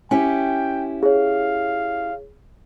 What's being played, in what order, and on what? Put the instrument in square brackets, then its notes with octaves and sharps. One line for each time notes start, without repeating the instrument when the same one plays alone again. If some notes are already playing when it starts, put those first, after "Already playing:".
[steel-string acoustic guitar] C#4 E4 G4 [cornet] G5 [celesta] G#5
[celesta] G#4 C#5 [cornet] F5